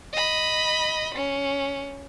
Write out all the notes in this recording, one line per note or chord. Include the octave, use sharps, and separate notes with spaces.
D#5 B5
C#4